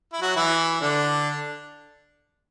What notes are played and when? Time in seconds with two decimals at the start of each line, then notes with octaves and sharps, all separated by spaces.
0.13 E4
0.21 F#3 F#4
0.36 E3 E4
0.81 D3 D4